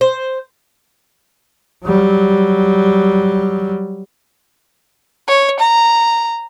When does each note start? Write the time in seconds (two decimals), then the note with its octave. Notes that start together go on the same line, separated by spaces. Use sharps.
0.01 C5
1.84 F#3 G3
5.28 C#5
5.60 A#5